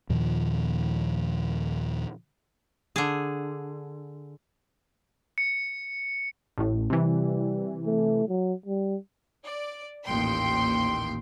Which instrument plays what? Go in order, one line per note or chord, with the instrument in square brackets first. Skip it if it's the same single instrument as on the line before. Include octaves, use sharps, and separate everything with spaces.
[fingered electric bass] D#2 A#2 D#3 F3
[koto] D3 G#4
[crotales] C#7
[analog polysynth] A1 A2
[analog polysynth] C3 E3 [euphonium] G3
[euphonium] A3
F#3
G3
[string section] D5
A1 D#2 A#2 G5 C6